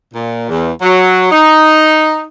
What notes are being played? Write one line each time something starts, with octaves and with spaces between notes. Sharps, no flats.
A#2
E2
F#3
D#4